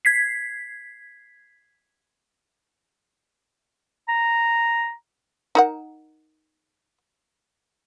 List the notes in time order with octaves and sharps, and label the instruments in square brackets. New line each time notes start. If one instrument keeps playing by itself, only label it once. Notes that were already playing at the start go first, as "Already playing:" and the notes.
[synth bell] G#6 B6 C7
[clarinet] A#5
[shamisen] D#4 A#4 F#5